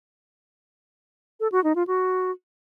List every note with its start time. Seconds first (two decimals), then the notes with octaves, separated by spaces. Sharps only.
1.40 A4
1.52 F#4
1.64 D#4
1.76 F4
1.87 F#4